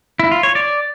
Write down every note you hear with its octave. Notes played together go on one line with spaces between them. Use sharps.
E4
F4
C#5
D5